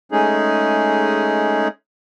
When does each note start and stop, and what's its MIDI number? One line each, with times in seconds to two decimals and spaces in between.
0.12 1.68 56
0.12 1.68 57
0.12 1.68 61
0.12 1.68 63
0.12 1.68 68